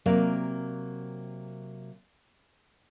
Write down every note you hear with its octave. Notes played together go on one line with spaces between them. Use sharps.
C3 F#3 A#3 A#4 D5 F5